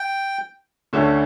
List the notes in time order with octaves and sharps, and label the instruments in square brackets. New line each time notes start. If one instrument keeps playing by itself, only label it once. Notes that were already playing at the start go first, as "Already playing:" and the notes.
Already playing: [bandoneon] G5
[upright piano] D2 D3 A3 C#4